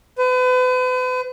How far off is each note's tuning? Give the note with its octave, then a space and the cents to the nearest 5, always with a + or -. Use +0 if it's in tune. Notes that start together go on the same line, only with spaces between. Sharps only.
B4 +40